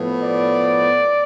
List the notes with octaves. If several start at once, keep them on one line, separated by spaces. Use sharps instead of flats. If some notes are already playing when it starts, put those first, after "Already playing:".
Already playing: A2 F3 B3
D5